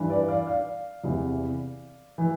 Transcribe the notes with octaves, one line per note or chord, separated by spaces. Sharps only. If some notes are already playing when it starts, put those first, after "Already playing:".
Already playing: G2 E3
B4 D5
D5 F5
D5 F5
E2 C3 E3
E3